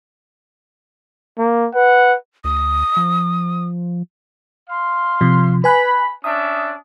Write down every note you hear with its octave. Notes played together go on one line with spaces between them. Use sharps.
A#3
B4 F#5
D2 D#6
F3
F5 C6
C3 F3
B4 G#5 B5 F#6
C#4 D4 E5 D#6